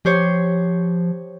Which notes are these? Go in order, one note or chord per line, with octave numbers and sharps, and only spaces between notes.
F3 G4 C5 C#5